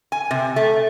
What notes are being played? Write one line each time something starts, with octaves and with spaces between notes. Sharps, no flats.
G#5
C3
A3